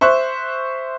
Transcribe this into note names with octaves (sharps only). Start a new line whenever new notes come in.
C5 E5 C#6 F#6